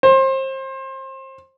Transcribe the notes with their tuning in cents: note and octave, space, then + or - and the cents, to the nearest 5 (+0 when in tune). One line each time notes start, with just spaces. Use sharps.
C5 +30